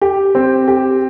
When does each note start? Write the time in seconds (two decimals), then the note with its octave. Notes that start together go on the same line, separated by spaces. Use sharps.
0.02 G4
0.35 C4
0.68 G4